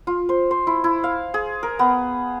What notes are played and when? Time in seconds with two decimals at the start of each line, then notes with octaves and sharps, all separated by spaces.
0.07 F4
0.29 C5
0.51 C5
0.67 E4
0.84 E4
1.04 F5
1.34 G#4
1.63 A#4
1.79 B3